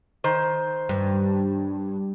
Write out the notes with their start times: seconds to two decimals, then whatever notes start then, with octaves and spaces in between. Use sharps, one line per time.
0.24 D#3 C5
0.89 G2